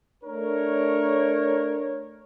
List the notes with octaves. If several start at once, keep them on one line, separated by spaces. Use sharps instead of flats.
A3 D4 A#4 C#5